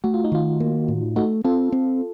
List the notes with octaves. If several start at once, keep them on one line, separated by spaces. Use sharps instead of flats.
A3 F#4
F4
D#4
D#3 F4
A#3
A2
A3 D#4 F#4
C4 F4 A4
C4